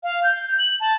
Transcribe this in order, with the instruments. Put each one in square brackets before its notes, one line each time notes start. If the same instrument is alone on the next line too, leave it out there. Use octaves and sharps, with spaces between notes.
[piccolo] F5
G6
F#7
A5